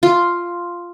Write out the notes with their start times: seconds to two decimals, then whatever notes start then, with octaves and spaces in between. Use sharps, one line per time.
0.03 F4